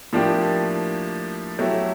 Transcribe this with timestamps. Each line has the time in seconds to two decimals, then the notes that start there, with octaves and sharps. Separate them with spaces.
0.13 A2 F3 A#3 D4 G4
1.59 F#3 A3 C#4 E4 G4